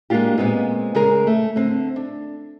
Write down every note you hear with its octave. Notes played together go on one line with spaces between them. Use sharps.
G#3 A#3 C#4 D4 F4 G4
A#2 G#3 B3 C4
C#3 G#3 G#4 A#4
A3
D3 C4
D4